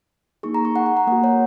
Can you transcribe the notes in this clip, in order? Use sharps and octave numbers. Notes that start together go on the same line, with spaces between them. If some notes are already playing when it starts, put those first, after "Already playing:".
A#3 D#4 G#4 C#6
A#5
C#6
F#5
F#5
A#5
A#3 F#4 F#5
C#5